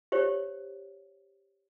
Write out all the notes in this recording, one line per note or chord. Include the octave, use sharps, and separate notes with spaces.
G4 C5 C#5